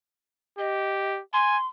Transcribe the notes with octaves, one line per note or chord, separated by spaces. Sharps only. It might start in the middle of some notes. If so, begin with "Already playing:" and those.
G4 D#5
G#5 C6